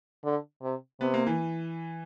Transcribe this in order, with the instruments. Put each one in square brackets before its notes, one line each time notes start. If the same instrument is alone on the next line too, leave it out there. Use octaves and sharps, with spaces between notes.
[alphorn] D3
C3
[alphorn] C3 [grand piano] B3
[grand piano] A#3
E3